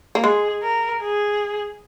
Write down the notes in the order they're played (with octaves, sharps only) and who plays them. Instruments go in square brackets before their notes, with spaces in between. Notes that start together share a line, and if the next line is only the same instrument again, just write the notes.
[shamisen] A#3
[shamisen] G#3 [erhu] G#4
[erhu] A#4
G#4